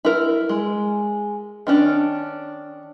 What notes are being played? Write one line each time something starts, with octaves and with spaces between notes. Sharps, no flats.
E4 A#4
G#3
D#3 C#4 D4